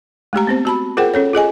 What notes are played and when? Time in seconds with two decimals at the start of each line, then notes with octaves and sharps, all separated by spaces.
0.33 G#3 A3 G4 A#5
0.47 B3 C4 C5
0.65 F#4 A5 B5
0.97 F4 G#4 A#4 C5 F#5 G5
1.14 C#4 A4 C#5
1.33 F4 G#4 D#5 G#5